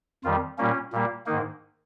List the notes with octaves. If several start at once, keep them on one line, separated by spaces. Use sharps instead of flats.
F2 D#3 G3 F4
A#2 G3 A#3 C#4
A#2 G3 A#3
G#2 D#3 A#3 D#4